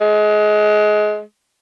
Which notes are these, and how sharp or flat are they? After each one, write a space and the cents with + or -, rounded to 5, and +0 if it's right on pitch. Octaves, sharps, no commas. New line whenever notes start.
G#3 +25